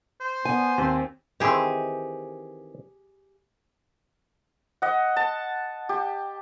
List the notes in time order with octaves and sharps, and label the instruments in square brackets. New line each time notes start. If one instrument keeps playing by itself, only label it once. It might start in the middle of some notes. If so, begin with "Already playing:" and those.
[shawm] C5
[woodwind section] B3 [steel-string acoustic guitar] G#5
[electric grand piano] D#2 C4
[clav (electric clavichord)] D#3 E3 C4 [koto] G4 G#4
[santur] D#5 F#5
A5
G4